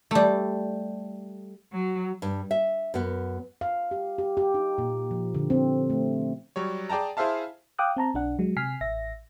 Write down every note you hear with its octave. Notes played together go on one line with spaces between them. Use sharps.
G3 A3
F#3
G2
E5
F#2 B3
F5
G4
G4
G4
D#4
A#2
F3
D3
C4
A3
F#3 G3 C#5
G#4 D5 G5 A5 A#5
E4 G#4 C5 E5 F5 A5
F5 G5 D6 D#6 F#6
C4 A5 A#5
B1 D4 F#5
F#3 G#3
C3 G#5 F6 B6 C7
A1 E5 A#6